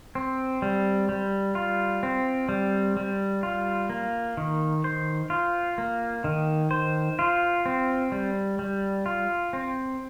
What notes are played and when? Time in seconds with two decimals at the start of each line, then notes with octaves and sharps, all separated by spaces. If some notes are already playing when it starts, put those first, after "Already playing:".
0.15 C4
0.62 G3
1.09 G3
1.55 F4
2.03 C4
2.49 G3
2.97 G3
3.43 F4
3.90 A#3
4.37 D#3
4.84 C5
5.30 F4
5.78 A#3
6.24 D#3
6.71 C5
7.19 F4
7.66 C4
8.12 G3
8.59 G3
9.06 F4
9.53 C4